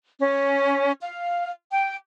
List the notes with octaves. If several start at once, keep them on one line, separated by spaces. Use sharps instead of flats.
C#4
F5
G5